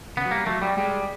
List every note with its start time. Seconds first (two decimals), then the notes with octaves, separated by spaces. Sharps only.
0.17 C#3 B3
0.25 F#3
0.31 G3 A#3
0.46 F#3 A3
0.62 G3
0.77 G3 G#3